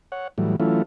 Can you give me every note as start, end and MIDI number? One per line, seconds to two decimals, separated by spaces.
0.12 0.28 73
0.12 0.28 78
0.38 0.56 45
0.38 0.56 52
0.38 0.56 54
0.38 0.56 55
0.60 0.82 52
0.60 0.82 54
0.60 0.82 57
0.60 0.82 61
0.60 0.82 64
0.60 0.82 65